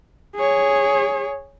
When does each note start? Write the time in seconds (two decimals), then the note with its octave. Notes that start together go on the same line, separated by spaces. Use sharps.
0.36 G#4 C#5